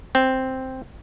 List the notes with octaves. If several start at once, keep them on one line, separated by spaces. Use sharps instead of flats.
C4